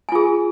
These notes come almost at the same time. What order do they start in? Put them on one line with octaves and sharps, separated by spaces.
G#5 F4 G#4